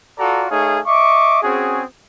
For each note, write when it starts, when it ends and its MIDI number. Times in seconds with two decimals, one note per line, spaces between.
0.19 0.45 65
0.19 0.45 66
0.19 0.45 69
0.19 0.45 74
0.19 0.45 82
0.50 0.79 57
0.50 0.79 63
0.50 0.79 68
0.50 0.79 73
0.50 0.79 77
0.86 1.41 75
0.86 1.41 76
0.86 1.41 85
0.86 1.41 86
1.42 1.83 60
1.42 1.83 61
1.42 1.83 66
1.42 1.83 68